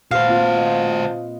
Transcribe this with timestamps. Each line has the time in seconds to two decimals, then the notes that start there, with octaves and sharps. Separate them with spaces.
0.11 A#2 F#4 B4 C5 F5
0.27 A#3 C4 F4
0.57 D#5